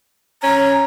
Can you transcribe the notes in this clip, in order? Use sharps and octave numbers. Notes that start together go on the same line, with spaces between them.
C#4 A#5